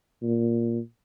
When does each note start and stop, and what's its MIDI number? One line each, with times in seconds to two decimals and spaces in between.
0.22 0.79 46